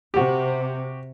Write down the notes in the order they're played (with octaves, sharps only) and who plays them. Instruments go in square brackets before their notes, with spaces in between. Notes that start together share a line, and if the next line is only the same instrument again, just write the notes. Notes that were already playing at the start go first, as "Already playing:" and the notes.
[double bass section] C3 [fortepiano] F#4 G4